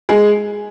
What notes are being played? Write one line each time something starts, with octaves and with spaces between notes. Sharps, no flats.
G#3 G#4